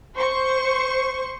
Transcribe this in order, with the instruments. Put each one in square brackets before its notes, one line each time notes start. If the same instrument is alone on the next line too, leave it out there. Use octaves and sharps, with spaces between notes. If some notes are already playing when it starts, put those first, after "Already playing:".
[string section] C5 C#6